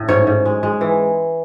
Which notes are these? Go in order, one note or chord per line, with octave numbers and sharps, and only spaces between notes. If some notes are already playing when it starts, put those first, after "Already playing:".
Already playing: A2
G#2 C#5
G#2
G#3
G#3
E3